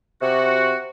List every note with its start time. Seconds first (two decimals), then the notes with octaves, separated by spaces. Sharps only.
0.22 C3 F#4